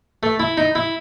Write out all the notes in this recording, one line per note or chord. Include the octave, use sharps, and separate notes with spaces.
A3
E4
D#4
E4